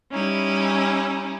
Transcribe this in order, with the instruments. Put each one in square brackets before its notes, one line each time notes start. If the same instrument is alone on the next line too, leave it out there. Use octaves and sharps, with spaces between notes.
[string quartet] G3 C#4 D#4 E4